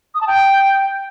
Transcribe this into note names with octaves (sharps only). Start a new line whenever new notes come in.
D#6
A5
G5